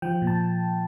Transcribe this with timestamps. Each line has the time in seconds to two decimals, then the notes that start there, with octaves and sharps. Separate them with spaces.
0.02 F3 G5
0.22 A#2
0.27 A5